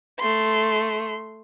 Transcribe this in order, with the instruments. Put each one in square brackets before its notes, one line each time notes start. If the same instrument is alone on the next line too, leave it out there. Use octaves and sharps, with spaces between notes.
[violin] A3 C6